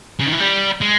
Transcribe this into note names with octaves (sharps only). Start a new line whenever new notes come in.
C#3
D#3
E3
G3
G#3